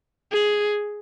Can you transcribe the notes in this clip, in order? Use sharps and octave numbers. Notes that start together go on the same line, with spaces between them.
G#4